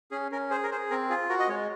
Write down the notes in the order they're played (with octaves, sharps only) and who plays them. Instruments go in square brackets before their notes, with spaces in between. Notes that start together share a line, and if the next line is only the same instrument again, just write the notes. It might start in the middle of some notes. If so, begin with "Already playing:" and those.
[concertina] C#4 G#4
C#4 A#4
G#4 C5
A#4
G#4 C5
C4 A#4
F4 G#4
F#4 A#4
D#5
G#3 C#5